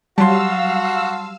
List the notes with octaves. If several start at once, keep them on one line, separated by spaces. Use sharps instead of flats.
F#3 G3 F#4 F5 A5 C6 E6